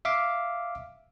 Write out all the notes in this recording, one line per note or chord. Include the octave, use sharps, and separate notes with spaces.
E5 F5 D6